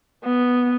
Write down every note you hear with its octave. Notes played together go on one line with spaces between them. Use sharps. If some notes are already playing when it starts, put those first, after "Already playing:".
B3